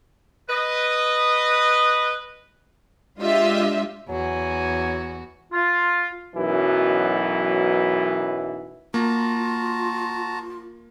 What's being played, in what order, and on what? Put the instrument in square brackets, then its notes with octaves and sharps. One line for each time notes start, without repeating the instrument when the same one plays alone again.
[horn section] B4 D#5
[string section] G#3 D4 F4 G4 D#5 E5
[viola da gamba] E2 F#4 [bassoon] F#3 [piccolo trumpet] G#5
[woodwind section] F4
[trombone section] B1 F#2 B2 E3
[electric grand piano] A#3 [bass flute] F4 [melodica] F#4 A5 A#5